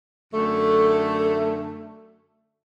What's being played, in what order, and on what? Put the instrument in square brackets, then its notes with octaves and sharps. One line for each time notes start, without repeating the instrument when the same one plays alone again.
[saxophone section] F#2 D3 A3